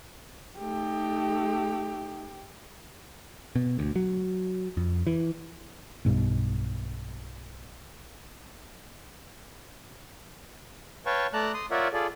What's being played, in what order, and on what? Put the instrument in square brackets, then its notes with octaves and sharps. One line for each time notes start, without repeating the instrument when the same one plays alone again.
[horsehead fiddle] A3 D#4 [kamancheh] G4
[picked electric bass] B2
D2
F#3
F2
E3
[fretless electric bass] B1 G2 B2
[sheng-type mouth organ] B4 C#5 F5 G5 A5 C#6
A3 D5 A5 A#5 F#6
C6 D#6
F4 A#4 C#5 D5 E5 F#5
F4 G#4 A4 D5